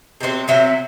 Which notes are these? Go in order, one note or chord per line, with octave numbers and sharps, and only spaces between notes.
C3 F#3 C4
C3 F#3 C4 E5